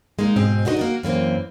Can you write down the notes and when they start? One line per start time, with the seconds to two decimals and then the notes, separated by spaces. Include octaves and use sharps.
0.19 G#3 A#3 D#4
0.36 G#2 B2 C4 G#4
0.65 D4 D#4 F#4 C5 D#5
0.77 A#3 F#4 A#4
1.03 F#2 E3 A#3 C4